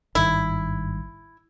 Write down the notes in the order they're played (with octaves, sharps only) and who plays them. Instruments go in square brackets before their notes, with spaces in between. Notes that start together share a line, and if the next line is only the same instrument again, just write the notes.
[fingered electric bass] G#1 G2 D#3 [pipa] E4